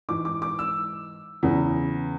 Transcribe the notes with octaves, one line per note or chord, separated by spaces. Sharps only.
G#2 E3 D6
D6
D6
E6
E2 C#3 E3